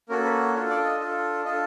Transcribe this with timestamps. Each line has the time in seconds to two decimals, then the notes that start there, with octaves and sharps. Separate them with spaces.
0.09 A#3 C#4 F#4 A4 A#4
0.25 B4
0.54 D4 F4 A4 C#5
0.70 D5
0.84 D#5
1.00 D4 F4 A4
1.45 D4 F4 A4 D#5